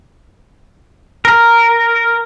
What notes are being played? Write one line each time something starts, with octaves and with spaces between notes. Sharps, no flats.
A#4